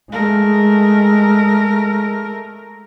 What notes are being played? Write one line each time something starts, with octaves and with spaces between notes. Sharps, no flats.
G#3 A3 A#4